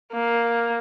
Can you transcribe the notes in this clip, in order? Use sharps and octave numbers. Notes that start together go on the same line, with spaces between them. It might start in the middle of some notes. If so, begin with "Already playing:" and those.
A#3